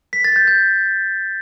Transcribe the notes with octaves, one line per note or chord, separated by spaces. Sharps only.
B6
A6
G6
G6